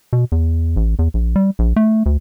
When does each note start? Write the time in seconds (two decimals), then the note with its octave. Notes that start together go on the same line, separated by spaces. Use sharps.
0.13 B2
0.32 E2
0.76 A1
0.99 E2
1.14 A#1
1.36 G3
1.59 A#1
1.76 A3
2.06 D2